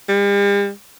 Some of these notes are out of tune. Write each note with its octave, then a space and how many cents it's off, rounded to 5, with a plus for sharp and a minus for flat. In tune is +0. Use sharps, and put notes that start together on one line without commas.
G3 +45